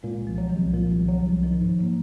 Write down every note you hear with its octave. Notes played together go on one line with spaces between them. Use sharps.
A#2 G#3
C2
F3
F#3
D#3
C2
A#2 F3
C2
D#3
F#3
F3
C2
D#3 F3
G#2
F#3 A#3